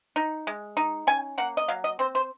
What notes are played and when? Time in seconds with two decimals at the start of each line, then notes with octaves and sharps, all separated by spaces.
0.16 D#4
0.47 G#3
0.77 D#4
1.07 C#4 G#5
1.38 A#3 F#5
1.57 D#5
1.68 F#3 F5
1.84 D#5
1.99 C4 C5
2.15 C5